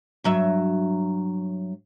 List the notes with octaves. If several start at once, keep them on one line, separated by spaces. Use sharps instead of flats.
G2 F#3 E5